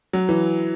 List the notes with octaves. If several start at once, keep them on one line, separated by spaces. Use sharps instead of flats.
F#3
E3